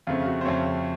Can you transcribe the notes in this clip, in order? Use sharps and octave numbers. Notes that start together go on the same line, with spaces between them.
F2 C#3 A3 C4 F4
F#4
C5
F2 C#3 A3 C4 C#5